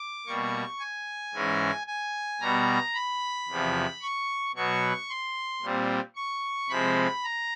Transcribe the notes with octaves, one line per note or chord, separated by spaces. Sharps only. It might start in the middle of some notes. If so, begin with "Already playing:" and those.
Already playing: D6
B2 G3 A#3 C#6
G#5
G#2 E3 G#3 C#4
G#5
B2 G3 B3 A#5
B5
E2 C3 F3
C#6
B2 F#3 B3 C#6
C6
A#2 G3 C4
C#6
C3 F3 G#3 C4 B5
A#5